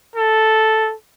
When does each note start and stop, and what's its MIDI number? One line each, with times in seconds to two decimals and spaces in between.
0.16 0.94 69